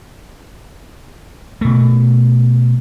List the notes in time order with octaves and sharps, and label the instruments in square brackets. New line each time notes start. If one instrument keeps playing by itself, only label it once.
[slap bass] B2 A3